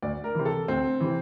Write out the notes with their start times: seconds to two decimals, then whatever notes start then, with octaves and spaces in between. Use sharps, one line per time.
0.02 D2 D5
0.24 A#4
0.35 C3 E3
0.45 A4
0.68 D2 C4
1.00 C3 E3